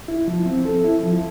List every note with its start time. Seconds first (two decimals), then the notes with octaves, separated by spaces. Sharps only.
0.08 E4
0.28 F3
0.46 C4
0.65 A4
0.84 E4
1.03 F3